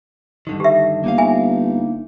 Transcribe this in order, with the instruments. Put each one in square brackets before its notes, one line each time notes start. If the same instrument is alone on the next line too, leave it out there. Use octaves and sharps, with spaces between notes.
[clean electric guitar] G2 D3 D#3
[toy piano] G4 E5
[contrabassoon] G1 [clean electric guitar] A#3 D#4 F5
[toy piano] E5 G#5